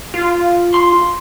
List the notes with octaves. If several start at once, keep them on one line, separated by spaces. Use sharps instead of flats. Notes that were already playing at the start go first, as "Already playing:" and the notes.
F4
C6